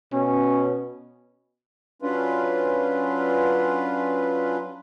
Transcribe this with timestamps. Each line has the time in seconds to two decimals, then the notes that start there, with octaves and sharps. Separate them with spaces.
0.13 B2 C#4
2.02 F#3 C#4 D4 F4 B4